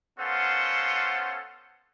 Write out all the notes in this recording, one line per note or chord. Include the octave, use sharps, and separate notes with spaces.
B3 C#4 F4 A4 C5 F#5